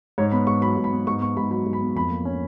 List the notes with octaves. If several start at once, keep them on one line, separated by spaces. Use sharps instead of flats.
G#2 C#5
B3 B5
G#2 C#6
F#3 B5
G#2
B5
B3
G#2 C#6
B3 C#6
G#2 B5
F#3 B5
G#2
B5
B3
F2 B5
A#3
C#4